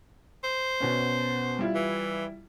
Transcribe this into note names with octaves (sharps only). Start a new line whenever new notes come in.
C5
B2 B3 C#4
G3 E4 F4
E3